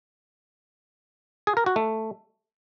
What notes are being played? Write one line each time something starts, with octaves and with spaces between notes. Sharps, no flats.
G#4
A#4
F#4
A3